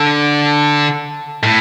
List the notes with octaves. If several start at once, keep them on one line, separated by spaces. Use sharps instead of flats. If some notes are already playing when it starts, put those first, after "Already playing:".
Already playing: D3
A2